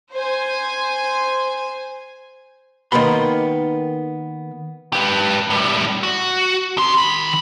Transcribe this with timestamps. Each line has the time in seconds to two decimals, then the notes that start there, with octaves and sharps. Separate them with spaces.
0.13 C5 G#5
2.92 D#3 A#3 B3 B5 C6
4.93 G4 B4
5.50 A2 G3
6.03 F#4
6.78 G4 C6
6.97 D#3 B5